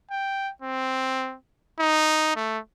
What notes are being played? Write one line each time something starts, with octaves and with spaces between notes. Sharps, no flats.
G5
C4
D#4
A3